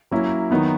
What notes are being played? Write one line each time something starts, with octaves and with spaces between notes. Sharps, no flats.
F#3 A#3 C#4 E4
D#3 F#3 B3 D#4